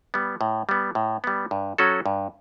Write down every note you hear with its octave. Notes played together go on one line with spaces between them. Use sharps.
G3 B3
A2
G3 B3
A2
G3 B3
G2
F#3 C#4 F#4 A4
G2